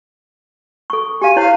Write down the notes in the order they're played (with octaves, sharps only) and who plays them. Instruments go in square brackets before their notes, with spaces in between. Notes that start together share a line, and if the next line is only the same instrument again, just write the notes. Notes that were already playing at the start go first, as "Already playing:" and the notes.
[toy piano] A4 C#6
[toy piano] G4 F5 [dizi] G#5
[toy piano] E4 C5 C#5 [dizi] F5